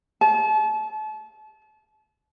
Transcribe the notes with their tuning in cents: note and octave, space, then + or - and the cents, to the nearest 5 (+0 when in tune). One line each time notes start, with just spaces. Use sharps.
A5 -35